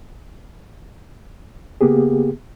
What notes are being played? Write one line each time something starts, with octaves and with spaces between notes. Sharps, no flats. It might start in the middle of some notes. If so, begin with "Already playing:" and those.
C#3 A#3 B3 G4 G#4